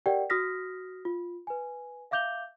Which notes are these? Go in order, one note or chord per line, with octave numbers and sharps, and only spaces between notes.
G4 A#4 D5 F#5 G5
F#4 D#6 F6 A#6 B6
F4
B4 G#5
E5 F5 D6 G6 F7 G7